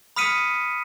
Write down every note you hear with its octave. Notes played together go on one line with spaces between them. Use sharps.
B5 D#6 F6 B6 C#7 D#7